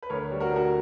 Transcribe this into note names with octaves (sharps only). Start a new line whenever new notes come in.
B4
D2 A#4 C#5
G3
F#4 A#4
D2 F#4 A#4